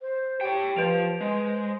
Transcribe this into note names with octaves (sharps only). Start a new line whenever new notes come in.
C5
G4 C#5 G5
F3 B4 D7 F7
G#3 C5